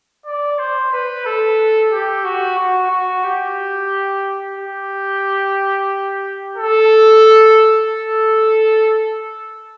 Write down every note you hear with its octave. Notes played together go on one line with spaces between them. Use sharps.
D5
C5
B4
A4
G4
F#4
F#4
F#4
G4
G4
A4
A4